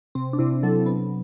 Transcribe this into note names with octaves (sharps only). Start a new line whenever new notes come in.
C3 C4
D4
C3 E4
F#3 A4
C3 B3